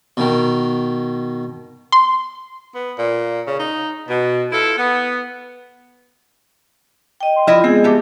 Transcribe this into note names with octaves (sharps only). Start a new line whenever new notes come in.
B2 D#3
C6
B3
A#2
C#3
D#4
B2
E4 F4 A4
B3
D#5 G5
C6
F3 E4 F4 D#5
G#3 B3 C4 G#4
A3 G4